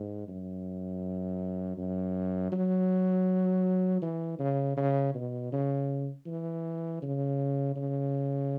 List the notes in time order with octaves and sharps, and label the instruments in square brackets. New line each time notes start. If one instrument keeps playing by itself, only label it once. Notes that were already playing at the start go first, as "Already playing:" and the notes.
Already playing: [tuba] G#2
F#2
F#2
F#3
E3
C#3
C#3
B2
C#3
E3
C#3
C#3